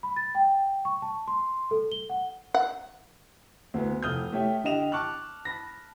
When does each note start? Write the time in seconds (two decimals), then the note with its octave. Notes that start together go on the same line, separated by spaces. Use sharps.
0.03 B5
0.16 A6
0.35 G5
0.85 C#6
1.02 A5
1.28 C6
1.71 A4
1.92 G7
2.10 F#5
2.54 F#5
3.74 D2 B3
4.03 F1 D#6 F6 G6
4.33 A3 G4 C#5 E5
4.64 D3 G4 D#5 E7 F7
4.92 A5 C#6 D6 F6 F#6
5.45 A5 B5 A#6